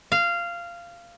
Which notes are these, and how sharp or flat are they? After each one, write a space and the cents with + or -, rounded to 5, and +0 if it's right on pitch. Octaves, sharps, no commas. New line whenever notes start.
F5 -15